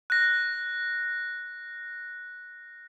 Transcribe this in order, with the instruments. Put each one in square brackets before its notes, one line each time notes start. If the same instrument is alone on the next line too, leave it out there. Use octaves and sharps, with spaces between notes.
[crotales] F#6 A#6